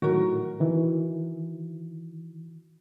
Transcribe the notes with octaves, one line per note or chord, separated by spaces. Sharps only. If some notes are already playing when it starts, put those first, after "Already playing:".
A2 D#3 F#3 F#4 A#4
D#3 E3